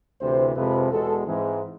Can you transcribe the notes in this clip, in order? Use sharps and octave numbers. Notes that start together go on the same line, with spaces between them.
D2 C3 E3 C5
F2 C3 F3 G#3 B4
E2 B2 G#3 A4
G#2 E3 G#3 C4 G#4